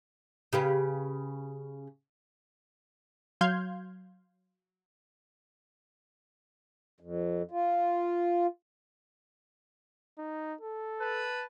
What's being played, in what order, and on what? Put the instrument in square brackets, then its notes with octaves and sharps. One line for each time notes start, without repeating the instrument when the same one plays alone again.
[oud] C#3 G4 B4
[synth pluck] F#3 F5 C6 F6 G6 G#6
[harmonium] F2
F4
[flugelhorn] D#4
A4
[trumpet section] B4 A5